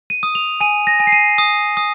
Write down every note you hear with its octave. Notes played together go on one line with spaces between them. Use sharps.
D#7
D#6
F7
G#5 D#7
A#6
G#5
C7
D#7
D#6
D#6